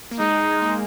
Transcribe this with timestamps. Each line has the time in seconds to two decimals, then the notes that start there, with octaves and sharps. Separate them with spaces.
0.11 A#3
0.20 G#3 D#4
0.62 A#3